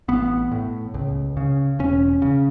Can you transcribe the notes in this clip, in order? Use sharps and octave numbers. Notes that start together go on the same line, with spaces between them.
A1 B3
A2
C#2
C#3
E1 C#4
C#3